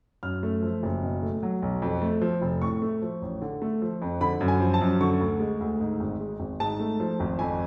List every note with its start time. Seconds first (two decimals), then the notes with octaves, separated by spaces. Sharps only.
0.23 F#2 F6
0.43 A3
0.62 F3
0.83 F#1
1.03 B2
1.22 A3
1.43 F#3
1.62 B1
1.82 F2
2.02 A3
2.21 F3
2.42 F1
2.61 A2 C#6
2.82 A3
3.02 F3
3.22 A1
3.42 D3
3.62 A3
3.82 F3
4.02 F2
4.21 D3 B5
4.41 F#2
4.48 G#5
4.60 F3
4.74 A5
4.81 F#2
5.01 D3 C#6
5.20 D2
5.40 G#3
5.60 D2
5.80 G#2
6.00 G#1
6.20 G#3
6.40 G#1
6.60 G#2 A5
6.80 A3
7.00 F3
7.20 G#1
7.39 F2 G#5